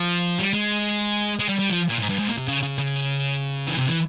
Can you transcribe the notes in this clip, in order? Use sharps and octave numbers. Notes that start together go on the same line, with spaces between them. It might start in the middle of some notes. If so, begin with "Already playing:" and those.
Already playing: F3
G3
G#3
G#3
G3
G3
F3
A#2
G#2
G2
G#2
A#2
C3
C#3
C#3
C#3
E3
C3
E3